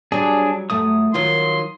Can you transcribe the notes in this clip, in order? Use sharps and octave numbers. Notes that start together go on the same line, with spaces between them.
F#3 G3 D4 G#4
F#2 A3 D#6
D#3 F#3 F4 C6